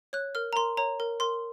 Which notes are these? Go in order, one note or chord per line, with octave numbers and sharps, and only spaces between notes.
C#5 F#6
A#4 F6
A#5
A#4 C6
C#5 A#5
A#4
A#4 C6